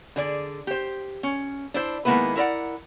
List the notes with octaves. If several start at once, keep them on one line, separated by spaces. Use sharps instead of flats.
D3 G#4 D5
G4 C5
C#4
D4 E4 C5
D#3 G#3 A#3 B3 E4 B4
E4 A#4 B4 D5 F#5